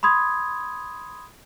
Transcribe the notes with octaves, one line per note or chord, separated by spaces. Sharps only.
B5 C6 D#6 G#6